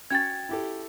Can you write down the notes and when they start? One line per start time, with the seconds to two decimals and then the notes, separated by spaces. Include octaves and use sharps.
0.10 C#4 F#4 G5 G#6 A6
0.49 E4 G4 A4